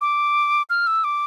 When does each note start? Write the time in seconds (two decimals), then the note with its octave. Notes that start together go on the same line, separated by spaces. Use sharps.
0.01 D6
0.70 F6
0.87 E6
1.04 D6